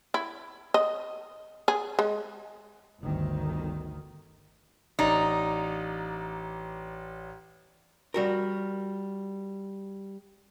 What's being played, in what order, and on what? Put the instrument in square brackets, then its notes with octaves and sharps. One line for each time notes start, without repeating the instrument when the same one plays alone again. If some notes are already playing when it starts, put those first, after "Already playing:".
[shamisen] E4
D#5
G#4
G#3
[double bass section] G1 D2 D#3
[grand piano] A1 D5 A#5 [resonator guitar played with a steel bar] D#4
[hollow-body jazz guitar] G3 F#4 A#4